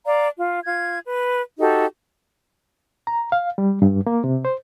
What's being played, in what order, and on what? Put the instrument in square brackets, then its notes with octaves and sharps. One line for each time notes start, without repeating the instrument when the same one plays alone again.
[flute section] D5 F5 A#5
F4
F4 G#6
B4
D#4 F#4 G4 A4
[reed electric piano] A#5
F5
G3
G2
A#3
C3
C5